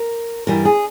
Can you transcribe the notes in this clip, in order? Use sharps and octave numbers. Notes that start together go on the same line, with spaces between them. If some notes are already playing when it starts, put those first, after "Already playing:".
Already playing: A#4
G2 E3 G3 A#4
G#4